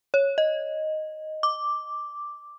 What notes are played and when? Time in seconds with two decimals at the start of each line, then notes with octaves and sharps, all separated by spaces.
0.14 C#5
0.38 D#5
1.43 D6